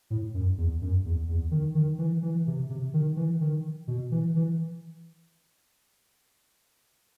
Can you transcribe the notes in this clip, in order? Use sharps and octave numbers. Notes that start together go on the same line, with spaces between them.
A2
F#2
E2
F#2
E2
E2
D#3
D#3
E3
E3
C3
C3
D#3
E3
D#3
B2
E3
E3